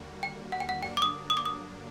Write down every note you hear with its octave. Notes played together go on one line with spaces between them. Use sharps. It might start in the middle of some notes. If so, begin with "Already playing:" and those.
Already playing: D#2 D3 G3 A#3 F#4
G5
F#5
G5
F#5
G2 D3 F#3 A#3 D4 G5
D6
D#6
D#6
D6
D#6